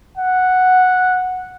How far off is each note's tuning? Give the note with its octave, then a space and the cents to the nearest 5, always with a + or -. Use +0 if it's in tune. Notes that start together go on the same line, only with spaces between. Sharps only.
F#5 -5